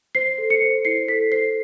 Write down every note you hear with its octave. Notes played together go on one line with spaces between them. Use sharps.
C5 C7
A4
C#7
C5
E4 C7
A4 B6
C5 C7